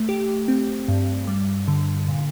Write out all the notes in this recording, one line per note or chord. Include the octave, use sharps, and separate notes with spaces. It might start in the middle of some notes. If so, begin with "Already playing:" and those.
Already playing: A3
G4
C4
G2
G3
D3
A#2